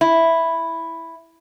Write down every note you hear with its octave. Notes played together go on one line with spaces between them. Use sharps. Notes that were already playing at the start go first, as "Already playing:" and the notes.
E4